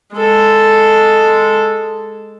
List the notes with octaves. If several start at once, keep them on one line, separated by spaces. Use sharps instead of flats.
G#3 A4